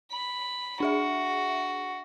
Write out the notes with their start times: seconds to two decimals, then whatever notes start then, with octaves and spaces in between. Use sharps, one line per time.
0.12 B5
0.80 D4 F#4 G#4 E5